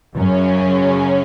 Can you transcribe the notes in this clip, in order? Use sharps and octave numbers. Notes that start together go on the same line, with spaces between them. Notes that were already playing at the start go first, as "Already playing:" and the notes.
F#2 C#3 F#3 C#4